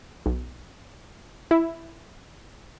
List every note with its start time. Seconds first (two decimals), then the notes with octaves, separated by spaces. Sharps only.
0.26 B1
1.51 E4